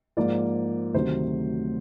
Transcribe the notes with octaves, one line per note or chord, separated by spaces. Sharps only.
G#2 F3 A#3 D5
D2 C3 D#3 F#3 C5